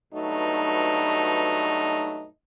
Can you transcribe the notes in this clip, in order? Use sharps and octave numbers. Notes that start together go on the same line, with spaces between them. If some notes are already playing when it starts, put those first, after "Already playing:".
G2 B2 F#3 A3 D#4